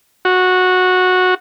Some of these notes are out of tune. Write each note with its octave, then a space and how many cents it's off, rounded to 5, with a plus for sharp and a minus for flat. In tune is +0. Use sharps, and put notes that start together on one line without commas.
F#4 -10